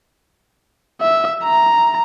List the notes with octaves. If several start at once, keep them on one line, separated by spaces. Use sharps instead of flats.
E5
A#5